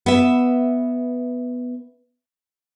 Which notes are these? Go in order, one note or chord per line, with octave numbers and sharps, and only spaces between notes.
B3 E5